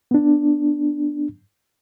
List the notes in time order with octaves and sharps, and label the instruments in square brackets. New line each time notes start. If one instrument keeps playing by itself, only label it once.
[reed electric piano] B3 D4